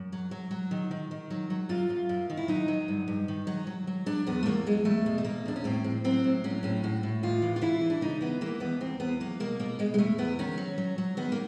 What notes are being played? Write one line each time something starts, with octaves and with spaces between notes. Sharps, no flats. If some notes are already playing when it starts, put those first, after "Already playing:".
Already playing: F#2
F#3
F#3
F#3
D#3
D#3
D#3
F#3
F#3
F#2 F4
F#2
F#2
D#3
E4
F#3 D#4
F#3
G2
G2
D#3
F#3
F#3
F#3
F#3 D4
E2 B3
A3
E2 A#3
F#3 G#3
E2 A3
B2
A3
B2 A#3
E2 D4
C#4
A2 C4
A2
F#3 C4
A2
F#3 C#4
A2 C#4
A2 F#4
A2
D#2 F4
E3
F4
E3 E4
E3
D4
C#3 D#4
E3 B3
E3 A#3
D#2 B3
E2 C4
E2 B3
F#3 A#3
B2 A#3
B2 A#3
B2 G#3
G#3
E2 A3
E2 B3
D#3 C#4
F#3
F#3
F#3
D#3 B3
A#3